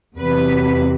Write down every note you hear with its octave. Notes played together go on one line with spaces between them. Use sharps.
E2 C3 F#3 B4